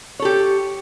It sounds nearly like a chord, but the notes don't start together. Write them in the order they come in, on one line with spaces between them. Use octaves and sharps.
C#5 A4 G4